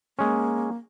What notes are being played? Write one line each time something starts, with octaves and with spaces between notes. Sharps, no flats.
G#3 A#3 C#4